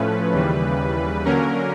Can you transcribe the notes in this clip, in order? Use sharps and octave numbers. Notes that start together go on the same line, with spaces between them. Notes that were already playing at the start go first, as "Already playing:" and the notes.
Already playing: A2 F3 A3 C#4 B4
D#2 C#3 E3 G3
D3 F#3 A#3 C#4 A#4